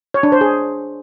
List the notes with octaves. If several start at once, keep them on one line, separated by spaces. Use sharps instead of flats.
C#5
D4
C5
G#4